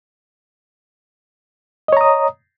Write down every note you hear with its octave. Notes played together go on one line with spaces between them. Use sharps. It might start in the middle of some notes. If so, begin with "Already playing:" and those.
C#5 D#5 A#5 D#6